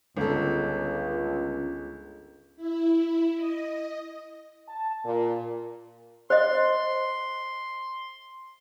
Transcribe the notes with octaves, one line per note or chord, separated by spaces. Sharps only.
G1 C#2 A4
E4
D#5
A5
A#2
C5 D#5 C6